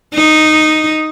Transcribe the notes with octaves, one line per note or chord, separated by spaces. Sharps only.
D#4